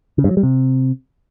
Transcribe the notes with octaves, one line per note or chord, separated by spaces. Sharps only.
C#3
G2
F#3
G3
C3